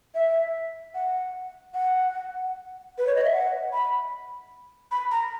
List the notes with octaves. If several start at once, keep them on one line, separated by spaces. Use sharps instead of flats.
E5
F#5
F#5
B4
C#5
D#5
E5
F#5
B5
B5
A#5